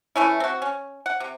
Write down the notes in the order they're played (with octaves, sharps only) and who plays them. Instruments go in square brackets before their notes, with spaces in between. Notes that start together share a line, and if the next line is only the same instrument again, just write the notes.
[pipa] E3 A3 C#4 E4
C4 F#4
C#4
F#5
C3